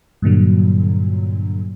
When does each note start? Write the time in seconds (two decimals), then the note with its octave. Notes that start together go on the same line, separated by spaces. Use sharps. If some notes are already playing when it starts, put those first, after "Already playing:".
0.22 G2 A#2 D3 F#3